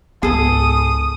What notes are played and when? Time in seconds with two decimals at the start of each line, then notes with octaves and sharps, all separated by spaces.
0.23 C#2 G#2 B3 G#4 A4 D#6